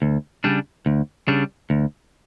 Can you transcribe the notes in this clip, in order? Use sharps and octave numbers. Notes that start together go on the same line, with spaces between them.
D2
C#3 G3 D4
D2
C#3 G3 D4
D2